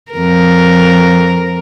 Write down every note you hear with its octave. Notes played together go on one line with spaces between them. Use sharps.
F2 A#4